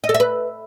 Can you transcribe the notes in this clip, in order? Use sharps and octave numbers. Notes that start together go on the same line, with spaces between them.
D#5
A4
E5
B4